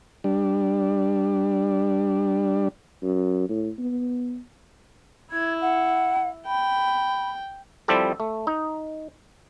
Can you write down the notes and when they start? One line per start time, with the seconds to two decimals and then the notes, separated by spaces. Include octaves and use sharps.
0.24 G3 D4
3.02 F#2
3.49 A2
3.79 B3
5.32 E4 G#6
5.62 F#5
6.46 G5 B5
7.88 F3 G3 C4 E4 G4 A4
8.20 A3
8.47 D#4